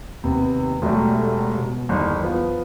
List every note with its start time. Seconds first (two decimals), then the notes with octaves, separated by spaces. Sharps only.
0.24 D#2 C3 B3
0.82 E1 F#3 G3 A3
1.58 B2
1.89 G1 E2 D#3
2.23 F3 B3